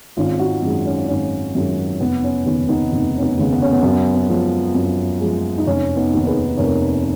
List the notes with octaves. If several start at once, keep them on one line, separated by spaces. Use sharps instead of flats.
G#1 C#4 F4
D#4 F#4
F#2 D#3 G#3
C#4
G#1 C#4
F#2 D#3 G#3
F1 B3
C#4
D#2 C#3 B3
B3 D#4
F1
C#4
B3
D#2 C#3
B3
C#4
B3
F#2 B3
B3
F3 G#3
F#2
F3 G#3
D#4
F1 C#4
B3 D#4
D#2 D#3 A#3
G#4 B4
F1 A#4 C#5